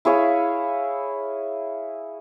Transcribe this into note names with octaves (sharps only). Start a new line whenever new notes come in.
E4 G#4 C#5 F5